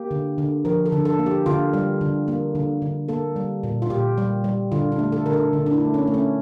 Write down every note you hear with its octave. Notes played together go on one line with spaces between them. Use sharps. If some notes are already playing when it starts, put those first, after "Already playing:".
Already playing: A#3 G4
D3
D3
F3 A#4
A4
D3
A4
A#3
G4
D3 F4
G3
D3
A#3
D3
D3
A#3 A4
G3
A#2
F4
A#2 G4
G3
G3
D3 F4
D4
A3
A4
D3 A#4
A4
D3
D4
E4
A3
C#4
A3
C#4